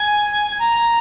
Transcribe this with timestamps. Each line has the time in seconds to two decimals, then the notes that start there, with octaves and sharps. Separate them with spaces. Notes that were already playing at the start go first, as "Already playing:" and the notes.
Already playing: G#5
0.59 A#5